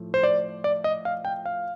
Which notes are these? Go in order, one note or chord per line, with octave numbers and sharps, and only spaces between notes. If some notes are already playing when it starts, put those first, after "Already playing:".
Already playing: A2 F3 A3
C5
D5
D5
D#5
F5
G5
F5